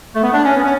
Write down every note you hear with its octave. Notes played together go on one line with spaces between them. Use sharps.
A3
B3
D4
C#4
B3
C#4